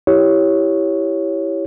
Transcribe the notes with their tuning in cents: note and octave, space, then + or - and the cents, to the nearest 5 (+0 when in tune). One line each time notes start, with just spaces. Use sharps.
E4 +0 G4 +0 C#5 +0